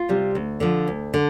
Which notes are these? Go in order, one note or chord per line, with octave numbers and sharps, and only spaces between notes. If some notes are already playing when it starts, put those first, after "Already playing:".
Already playing: F4
C3 G3
D2
D3 F3
D2
D3